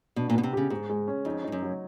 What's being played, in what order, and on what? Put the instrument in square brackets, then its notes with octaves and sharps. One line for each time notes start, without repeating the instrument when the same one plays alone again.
[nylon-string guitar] B2 [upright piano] D4
[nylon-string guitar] A#2
[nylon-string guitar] B2 [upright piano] B3
[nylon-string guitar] C3
[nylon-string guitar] C#3 [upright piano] G4
[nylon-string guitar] G#2 [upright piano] G#3
[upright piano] G#3
C#4
[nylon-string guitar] F2 [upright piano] D#4
[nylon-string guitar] G2 [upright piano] D#4
[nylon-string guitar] F#2
[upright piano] F#3